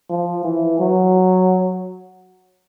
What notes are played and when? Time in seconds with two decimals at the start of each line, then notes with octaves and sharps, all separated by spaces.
0.10 F3
0.45 E3
0.80 F#3